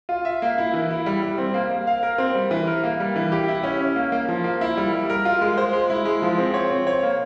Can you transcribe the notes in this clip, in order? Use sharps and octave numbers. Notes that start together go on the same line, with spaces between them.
F4
E5
A#3
E4
E3
E4
G3
G3
C4
A#3
A#3
F5
A#4
C4
G3
E3
A#4
A#3
G3
E3
G4
E4
C#4
C#4
A#3
A#3
F3
A#3
E4
G3
G3
A#4
F4
G#3
C5
G#3
E4
G#3
F3
C4
C#5
C4
C#5
A#3